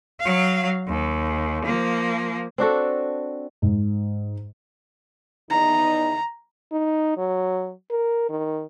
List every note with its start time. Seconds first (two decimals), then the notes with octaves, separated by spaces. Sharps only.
0.20 F#3 F5
0.88 D#2
1.65 F3 A#3
2.58 C4 D4 F#4 A4
3.62 G#2
5.50 E2 D#4 A#5
6.72 D#4
7.17 F#3
7.90 A#4
8.29 D#3